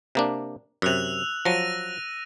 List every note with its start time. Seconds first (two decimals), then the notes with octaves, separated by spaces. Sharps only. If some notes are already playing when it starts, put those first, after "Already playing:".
0.15 C3 A#3 D4
0.82 F#2 C3 E6 F#6 F7
1.45 F3 F#3 A#6 D#7